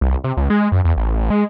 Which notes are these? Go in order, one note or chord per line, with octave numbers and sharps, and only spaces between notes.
C2
C3
C#2
G#3
F#2
E2
A1
G#3